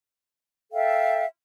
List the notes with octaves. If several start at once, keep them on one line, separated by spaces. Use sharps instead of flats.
A4 E5 F5 G5